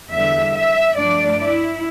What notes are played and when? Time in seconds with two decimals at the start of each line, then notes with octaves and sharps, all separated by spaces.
0.12 E2 D3 G3 E5
0.55 E5
0.98 G2 F3 A3 D4 D5
1.40 E4